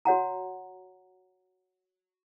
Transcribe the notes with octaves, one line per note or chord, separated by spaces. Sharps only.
F#4 C#5 F#5 A#5